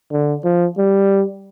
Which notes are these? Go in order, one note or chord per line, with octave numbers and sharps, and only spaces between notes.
D3
F3
G3